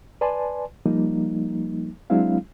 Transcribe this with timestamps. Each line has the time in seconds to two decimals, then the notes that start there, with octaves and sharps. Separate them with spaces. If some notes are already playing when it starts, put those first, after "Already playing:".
0.21 B4 D5 G#5 A5 C6
0.86 F3 G3 A#3 D#4
2.10 F#3 G#3 C4 D4 E4 F5